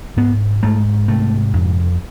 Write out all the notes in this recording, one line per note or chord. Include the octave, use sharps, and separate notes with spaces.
G#2 B3
G#2 A3
C3 A3
F2